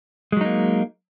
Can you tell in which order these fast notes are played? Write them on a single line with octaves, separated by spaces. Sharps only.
G#3 F#3 D#4 A#3